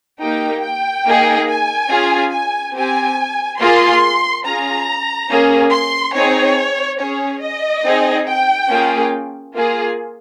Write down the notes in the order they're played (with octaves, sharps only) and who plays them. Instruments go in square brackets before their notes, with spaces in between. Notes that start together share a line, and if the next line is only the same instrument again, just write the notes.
[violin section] A#3 D#4 G4 G5
G5
A#3 D#4 G#4
G#5
C#4 F4 G#4
G#5
C4 G4 G#5
A#3 F4 G#4 C6
C#4 F4 G#4 A#5
A#3 C#4 G#4
C6
C4 D#4 G#4 C#5
C#4 G#4 C#5
D#5
C4 D#4 G#4
G5
A#3 C#4 F4 G#4
A#3 F4 G#4